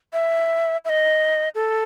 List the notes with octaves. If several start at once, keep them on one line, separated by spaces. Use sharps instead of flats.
E5
E5
D#5
A4